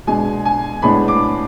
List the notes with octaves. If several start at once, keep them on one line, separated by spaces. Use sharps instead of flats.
B2 G#3 D4 G#5
G#5
A2 G#3 B3 D4 B5
D6